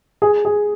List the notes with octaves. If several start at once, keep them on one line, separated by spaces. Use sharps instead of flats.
G#4
G#4